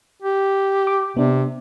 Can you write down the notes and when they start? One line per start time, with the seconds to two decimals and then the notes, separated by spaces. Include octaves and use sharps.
0.22 G4
0.87 D6
1.17 C3 B3 D4